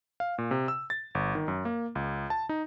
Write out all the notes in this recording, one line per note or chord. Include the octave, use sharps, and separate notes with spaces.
F5
A#2
C3
E6
A6
G1
D#3
F#2
A#3
C#2
A5
D#4